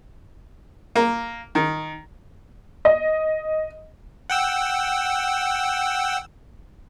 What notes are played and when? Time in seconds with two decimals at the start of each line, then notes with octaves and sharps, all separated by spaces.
0.95 A#3
1.55 D#3
2.85 D#5
4.30 F#5 G5 E6